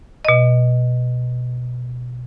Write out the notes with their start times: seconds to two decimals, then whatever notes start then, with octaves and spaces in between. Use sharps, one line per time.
0.25 B2 D#5